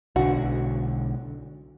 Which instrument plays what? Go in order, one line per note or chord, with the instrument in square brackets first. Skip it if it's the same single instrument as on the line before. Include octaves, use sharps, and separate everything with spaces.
[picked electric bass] B1 D3 [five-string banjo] F#4